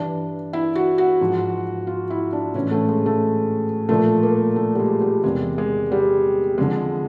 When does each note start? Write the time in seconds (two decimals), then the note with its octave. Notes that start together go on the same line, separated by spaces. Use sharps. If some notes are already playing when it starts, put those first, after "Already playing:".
Already playing: G2 E3 D4
0.53 E4
0.75 F#4
0.98 F#4
1.21 G#2 F3
1.87 F4
2.10 E4
2.33 D4
2.54 A2 E3 C#4
2.71 A3
2.89 G#3
3.06 A3
3.89 A#2 F3 A3
4.23 A#3
4.56 A3
4.75 G3
4.79 G#3
5.02 G3
5.24 E2 C3 D#3 G#3
5.58 G#3
5.92 G3
6.58 F2 D3 F3 G#3